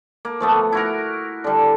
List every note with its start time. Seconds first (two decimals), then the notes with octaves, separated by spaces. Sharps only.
0.25 A#3
0.40 F3 A3 B3
0.72 E4 F#4 A#4
1.44 D3 G3